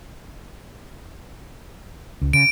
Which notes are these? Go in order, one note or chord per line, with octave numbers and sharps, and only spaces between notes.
C#2
C#3 D7